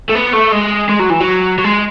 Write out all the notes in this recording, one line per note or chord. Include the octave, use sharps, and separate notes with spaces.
A3
B3
A3
G#3
G#3
F#3
E3
F#3
F#3
G#3